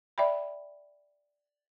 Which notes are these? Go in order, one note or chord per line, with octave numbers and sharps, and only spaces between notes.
D5 E5 G5 B5